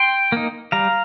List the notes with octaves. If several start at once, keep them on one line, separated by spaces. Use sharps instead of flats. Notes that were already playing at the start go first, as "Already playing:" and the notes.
Already playing: G5 C6
A#3 D#4
G3 F5 A#5